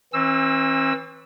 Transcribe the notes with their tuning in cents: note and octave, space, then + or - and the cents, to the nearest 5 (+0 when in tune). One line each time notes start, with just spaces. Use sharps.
E3 -25 C4 +45 E6 -5